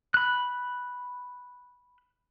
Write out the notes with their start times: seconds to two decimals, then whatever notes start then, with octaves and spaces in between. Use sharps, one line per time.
0.14 B5 F#6